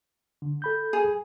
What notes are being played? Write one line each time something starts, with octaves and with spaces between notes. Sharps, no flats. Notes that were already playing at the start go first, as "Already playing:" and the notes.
D3
A4 B5 G6
G#4